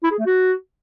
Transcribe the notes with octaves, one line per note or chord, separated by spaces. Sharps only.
E4
G#4
A3
F#4